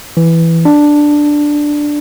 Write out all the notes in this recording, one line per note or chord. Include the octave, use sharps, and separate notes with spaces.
E3
D4